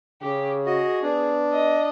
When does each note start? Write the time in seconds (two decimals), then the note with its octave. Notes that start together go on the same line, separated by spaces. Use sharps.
0.22 C#3 G4
0.66 F#4 G#4 D#5
1.03 B3 D4
1.53 D#5